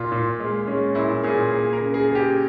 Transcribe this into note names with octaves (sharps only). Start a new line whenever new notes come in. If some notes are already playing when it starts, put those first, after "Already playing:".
Already playing: A#2 F4
A#2
G#3
G#3 C#4
A#2 E4
A#2 G#4
A#3 G#4
A#4
C#3
G#4
C#3 G#4
G4